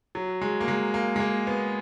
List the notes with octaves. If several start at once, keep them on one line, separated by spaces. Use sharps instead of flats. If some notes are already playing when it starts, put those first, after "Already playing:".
F#3
G#3
A#3
G#3
A#3
G#3
A#3
B3